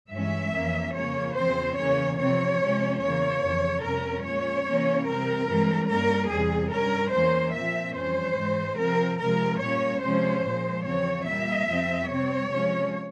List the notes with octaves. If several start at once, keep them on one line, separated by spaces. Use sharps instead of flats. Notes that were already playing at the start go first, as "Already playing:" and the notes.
G2 E3 G#3 C#4 E5
F2 E3 A#3 C#4
F2 C#3 F3 A#3 C#4 C#5
E2 C#3 F3 C4 C5
E2 C#3 E3 A#3 C#4 C#5
C3 F3 C4 C#5
C3 F3 G#3 C#4
E2 C#3 E3 A#3 C#5
F2 C#3 E3
F2 C3 G3 C#4 A#4
A#2 G#3 C#4 C#5
C3 E3 A#3 C#4
C3 G3 C4 A#4
G2 E3 G#3 C4
G2 G3 A#3 C#4 A#4
E2 C3 G3 G#4
G2 G3 C#4 A#4
E2 E3 A#3 C#4 C5
A#2 F3 C4 E5
F2 E3 G3 C#4 C5
G#2 E3 G#3
C3 F3 C4 A#4
C3 F3 G#3 A#4
A#2 G3 A#3 C#4 C#5
C3 F3 G#3 C#4 C5
A#2 F3 G#3
E2 C#3 F3 C4 C#5
A#2 G3 A#3 E5
F2 C3 F3 C4
C3 G3 C4 C#5
C3 F3 G#3 C#4